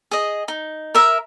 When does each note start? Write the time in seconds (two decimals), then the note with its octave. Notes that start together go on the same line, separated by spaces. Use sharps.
0.11 G#4 D#5
0.48 D#4
0.95 A#4 E5 A#5